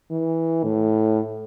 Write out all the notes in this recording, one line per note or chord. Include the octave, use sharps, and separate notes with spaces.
E3
A2